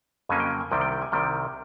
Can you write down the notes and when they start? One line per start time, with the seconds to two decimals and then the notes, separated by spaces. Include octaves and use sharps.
0.29 F2 C#3 F#3 A#3 C#4 G#5
0.40 G5
0.51 G5
0.61 G#5
0.71 C2 C3 D#3 G3 G5
0.81 G5
0.92 G5
1.02 G#5
1.12 C2 C3 D#3 G3 G5